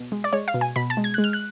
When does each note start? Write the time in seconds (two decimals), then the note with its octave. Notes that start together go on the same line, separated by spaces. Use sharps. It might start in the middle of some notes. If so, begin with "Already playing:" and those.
Already playing: B2
0.12 G#3
0.24 D5
0.33 G#3 C#5
0.48 F5
0.54 B2
0.61 G#5
0.76 B2 B5
0.90 A5
0.97 G#3
1.04 G#6
1.14 G#3 F#6
1.24 F6
1.33 F#6